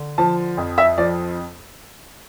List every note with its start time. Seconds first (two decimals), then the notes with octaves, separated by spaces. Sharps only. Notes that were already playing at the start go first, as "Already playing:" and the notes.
Already playing: D3
0.18 F3 A5
0.57 F2
0.78 E5
0.98 F3 D5